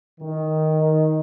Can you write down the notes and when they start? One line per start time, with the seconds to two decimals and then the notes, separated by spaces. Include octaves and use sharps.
0.21 D#3